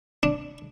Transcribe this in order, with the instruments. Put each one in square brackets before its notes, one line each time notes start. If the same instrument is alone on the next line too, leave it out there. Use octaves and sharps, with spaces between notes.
[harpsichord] D4